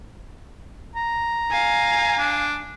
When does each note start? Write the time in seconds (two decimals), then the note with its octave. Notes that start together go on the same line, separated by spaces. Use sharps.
0.95 A#5
1.50 F5 G#5
2.18 D4